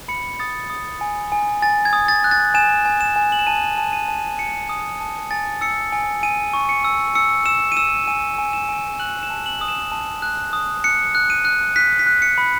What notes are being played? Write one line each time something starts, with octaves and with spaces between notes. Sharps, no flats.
B5 C#7
D#6 A6
D#6
G#5
G#5
G#5 A6
G#6
D#6
A6
F#6
A6
G#5 E7
G#5
E7
G#5
F#7
E7
A5 D#7
A5
D#7
A5
A5 C#7
D#6
A5
G#5 A6
E6 C#7
G#5
G#5 D#7
C#6
C#7
E6
E6 C#7
E6 E7
D#7
E6 E7
G#5 D#7
G#5
E7
G#5
F#6 F#7
E7
A5
F#7
D#6
E7
A5
F#6
D#6
F#6 C#7
F#6
D#7
F#6
F#6 B6
B6
F#6
C#7
B5